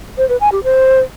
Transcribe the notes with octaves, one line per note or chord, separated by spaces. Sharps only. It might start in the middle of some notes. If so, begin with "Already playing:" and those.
C5
B4
G#5
G4
C5